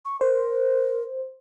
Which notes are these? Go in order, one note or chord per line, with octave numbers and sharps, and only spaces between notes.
C#6
A#4 C5